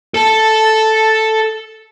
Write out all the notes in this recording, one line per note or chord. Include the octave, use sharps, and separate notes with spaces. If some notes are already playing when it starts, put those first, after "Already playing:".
A4 A5